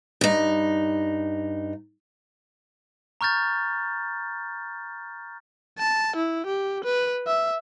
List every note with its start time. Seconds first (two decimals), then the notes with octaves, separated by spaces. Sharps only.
0.21 G2 D#4
3.21 A#5 C#6 F6 G6 A6
5.78 A5
6.16 E4
6.46 G4
6.84 B4
7.27 E5